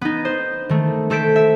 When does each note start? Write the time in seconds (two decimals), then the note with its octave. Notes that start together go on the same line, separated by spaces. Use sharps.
0.01 B3 D#4
0.25 C5
0.69 D#3 A3
1.10 A3 A4 C5 B6 D7
1.36 E5